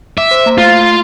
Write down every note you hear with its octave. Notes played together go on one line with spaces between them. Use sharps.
E5 D6
C5
A#3 A#5
A3 F4